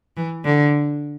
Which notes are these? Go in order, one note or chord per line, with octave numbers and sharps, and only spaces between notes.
E3
D3